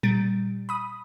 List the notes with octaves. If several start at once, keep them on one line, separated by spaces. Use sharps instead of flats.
A#2 G3 A6 D7
B5 D#6